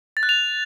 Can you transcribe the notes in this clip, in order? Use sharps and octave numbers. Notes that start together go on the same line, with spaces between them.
A6
F#6
F7